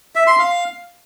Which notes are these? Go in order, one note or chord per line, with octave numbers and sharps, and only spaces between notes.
E5
C6
F5